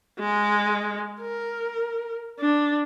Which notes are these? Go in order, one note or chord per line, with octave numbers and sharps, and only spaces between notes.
G#3
A#4
D4